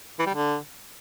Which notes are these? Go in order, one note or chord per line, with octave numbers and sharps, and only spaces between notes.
E3
G3
D3